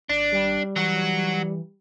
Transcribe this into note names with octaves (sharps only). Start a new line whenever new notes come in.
G#1 D4
G3
E3 F#3 F#4